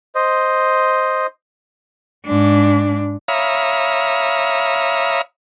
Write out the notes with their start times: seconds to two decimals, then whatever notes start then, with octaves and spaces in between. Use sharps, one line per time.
0.15 C5 D#5
2.25 G#2 D4
3.28 C#5 E5 F5 A#5 B5 D#6